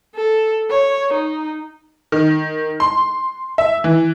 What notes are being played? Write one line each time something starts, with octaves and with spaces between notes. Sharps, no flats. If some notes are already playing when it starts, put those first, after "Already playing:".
A4
C#5
D#4
D#3
C6
E5
E3